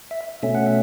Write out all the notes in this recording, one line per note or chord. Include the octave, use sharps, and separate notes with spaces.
E5
B2 A3 C#4 E5
F#5
E5